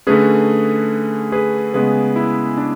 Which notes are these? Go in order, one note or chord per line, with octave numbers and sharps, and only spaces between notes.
D3 A3 C#4 G#4 B4
G#4 B4
C#3 G#3 B3 G#4 B4
E4
D4